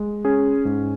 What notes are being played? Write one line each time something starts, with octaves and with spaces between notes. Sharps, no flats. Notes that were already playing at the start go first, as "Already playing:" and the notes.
Already playing: G#3
C#4 G#4
G#2